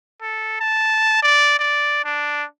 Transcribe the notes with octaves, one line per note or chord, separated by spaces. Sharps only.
A4
A5
D5
D5
D4